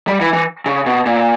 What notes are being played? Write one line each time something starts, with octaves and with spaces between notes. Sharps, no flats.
G3
E3
E3
C#3
B2
A#2